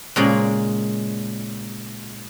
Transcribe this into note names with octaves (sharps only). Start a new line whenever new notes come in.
A#2 C#3 G#3